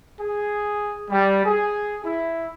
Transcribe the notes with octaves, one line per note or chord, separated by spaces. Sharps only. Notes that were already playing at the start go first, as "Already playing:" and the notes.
G#4
G3
G#4
E4